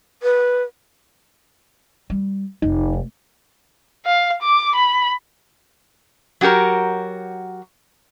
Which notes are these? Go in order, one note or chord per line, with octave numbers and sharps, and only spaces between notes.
B4
G3
F1 D#4
F5
D6
B5
F#3 F#4 G4 A#4 A#5